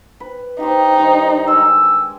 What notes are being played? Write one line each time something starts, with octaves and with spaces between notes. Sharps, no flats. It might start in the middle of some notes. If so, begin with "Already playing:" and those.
B4
D#4 G4 C5
G2 D#3 C5
G#3 E6
D6